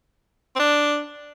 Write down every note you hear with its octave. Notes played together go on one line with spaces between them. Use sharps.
C4
D4